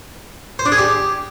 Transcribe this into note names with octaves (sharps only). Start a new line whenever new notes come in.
C5
D4
G#4
G4